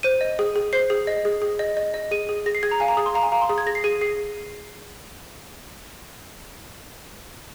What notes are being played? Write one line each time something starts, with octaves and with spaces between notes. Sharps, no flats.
C5 D#7
D#5
G#4
G#4
C5 C7
G#4
D#5
G#4
G#4
D#5
D#5
D#5
G#4 D#7
G#4
G#4 A#6
C7
G#4 G#6
A#5
F5 G#5
A#5
G#4 D#6
C6
F5 A#5
G#5
F5 A#5
C6
G#4 D#6
G#6
G#4 A#6
C7
G#4 D#7
G#4 C7